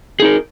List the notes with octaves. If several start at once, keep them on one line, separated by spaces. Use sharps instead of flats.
D#4 G#4 A#4